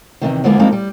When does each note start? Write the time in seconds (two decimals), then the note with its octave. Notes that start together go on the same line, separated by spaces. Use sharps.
0.22 E2 G#2 C3 D#3
0.44 D2 D3 F3 G#3 A#3 B3
0.59 F3 G3 G#3 A#3 C4 D#4
0.72 G3